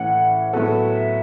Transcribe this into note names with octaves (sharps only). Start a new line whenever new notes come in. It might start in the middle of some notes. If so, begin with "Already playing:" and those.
Already playing: A2 E3 A3 C#4 F#5
F#5
A2 F#3 B3 F#4 A4 E5